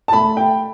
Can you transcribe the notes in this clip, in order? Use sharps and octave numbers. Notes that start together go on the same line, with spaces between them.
A5
A3 B5
G5